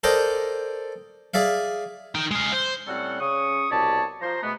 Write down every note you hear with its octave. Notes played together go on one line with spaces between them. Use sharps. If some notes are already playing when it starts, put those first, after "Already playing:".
A4 A#4 C5 D5 D#5 G5
G#4 D5 E5 F5
D#4 G5
G#3 F5
C5
A2 G3 C4 C#4 A4 F#5
C#3 C#6 D#6
C2 B2 G4 C#5 D5 A5
F3 C5 A#5
B2 G#3 A3 B3